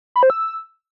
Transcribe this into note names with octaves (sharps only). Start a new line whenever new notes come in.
B5
C5
E6